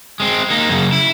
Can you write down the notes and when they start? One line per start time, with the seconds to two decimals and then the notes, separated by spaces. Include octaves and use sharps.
0.20 G#3 C4
0.50 A#3 D#4
0.69 F#2 C#3
0.92 E4